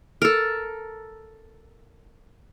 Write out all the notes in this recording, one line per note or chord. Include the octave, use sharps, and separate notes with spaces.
A4 A#4